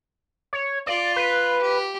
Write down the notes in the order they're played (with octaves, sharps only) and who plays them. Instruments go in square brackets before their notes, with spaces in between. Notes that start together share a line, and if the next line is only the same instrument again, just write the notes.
[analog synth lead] C#5
[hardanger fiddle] F4 [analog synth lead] D5
[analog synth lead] B4
[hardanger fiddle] G4